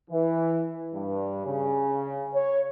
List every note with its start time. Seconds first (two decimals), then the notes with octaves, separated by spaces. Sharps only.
0.11 E3
0.94 G2
1.45 C#3
2.34 C#5